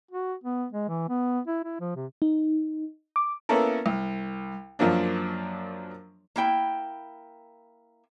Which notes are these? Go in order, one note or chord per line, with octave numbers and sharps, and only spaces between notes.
F#4
B3
G#3
E3
B3
E4
E4
F3
C3
D#4
D6
A#3 B3 C#4 E4 A4 A#4
C2
F#2 F3 F#3 A#3 D4
A#3 E4 G5